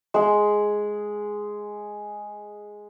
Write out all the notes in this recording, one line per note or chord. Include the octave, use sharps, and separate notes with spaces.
G#3 G#4